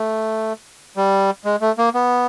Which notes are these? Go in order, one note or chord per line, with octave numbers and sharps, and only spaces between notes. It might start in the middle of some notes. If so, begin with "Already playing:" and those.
Already playing: A3
G3
G#3
A3
A#3
B3